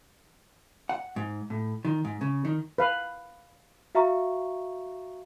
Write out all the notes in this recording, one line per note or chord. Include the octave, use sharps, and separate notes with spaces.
F#5
G#2
A2
D#3
G#2
C#3
D#3
B4 F5
F#4 E5 F5 A#5 C#6